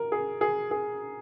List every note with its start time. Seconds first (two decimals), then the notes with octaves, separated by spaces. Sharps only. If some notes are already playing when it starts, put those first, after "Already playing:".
Already playing: A#4
0.12 G#4
0.41 G#4
0.71 G#4